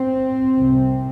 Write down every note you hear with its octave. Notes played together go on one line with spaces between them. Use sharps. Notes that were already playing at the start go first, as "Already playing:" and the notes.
Already playing: C4
C2 C3